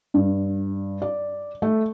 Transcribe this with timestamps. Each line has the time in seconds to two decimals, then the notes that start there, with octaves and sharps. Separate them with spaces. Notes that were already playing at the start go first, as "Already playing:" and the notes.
0.14 G2
1.02 D5
1.62 A3